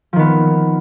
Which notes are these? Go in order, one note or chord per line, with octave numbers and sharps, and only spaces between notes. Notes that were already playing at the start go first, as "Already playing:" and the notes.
D#3 F3 B3